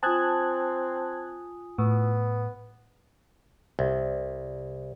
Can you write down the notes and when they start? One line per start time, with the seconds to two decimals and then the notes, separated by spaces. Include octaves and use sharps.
0.03 C4 F4 G#5 A5 D#6 F#6 G#6
1.78 A2 B3
3.79 C2